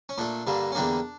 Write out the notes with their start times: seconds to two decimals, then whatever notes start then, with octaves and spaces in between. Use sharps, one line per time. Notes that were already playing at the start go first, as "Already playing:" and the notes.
0.09 C#4
0.18 A#2 A3 D4
0.47 G2 D3 G3 A#3
0.72 C#4
0.75 E2 D3 G3 A#3 D4